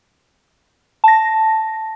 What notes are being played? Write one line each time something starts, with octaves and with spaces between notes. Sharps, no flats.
A5 A#6